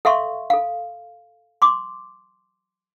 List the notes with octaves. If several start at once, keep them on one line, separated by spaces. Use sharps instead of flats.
A4 E5 F5 C6 C#6
A4 F5
C6 D6